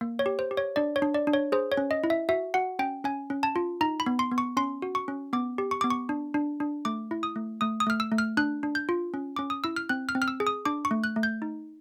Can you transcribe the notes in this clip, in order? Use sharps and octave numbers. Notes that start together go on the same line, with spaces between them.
A#3
C#5
G4
C5
G4
C#5
D4 D5
C#5
D4
D5
D4
C#5
G#4 C5
C#5
C#4
D#5
E4
E5
F#4 E5
F#4 F#5
C#4 G5
C#4 G#5
C#4
A5
F4
D#4 A#5
B5
B3
C6
B3
C#6
C#4 C6
F#4
C#6
C#4
B3 D6
G4
C#6
B3 D6
C#6
D4
D4
D4
A3 D6
E4
D#6
A3
A3 D#6
D#6
A3 F6
E6
A3
F6
D4 F#6
D4
G6
F4
C#4
C#4 D6
D#6
E4 E6
F6
C4 F#6
F6
C4
F6
E6
G#4
D#6
D4 D6
C#6
A3
F#6
A3
G6
D#4